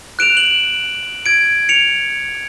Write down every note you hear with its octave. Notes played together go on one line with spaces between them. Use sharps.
F#6 D7 E7 F7
F#7
G#6 D7
C#7 F7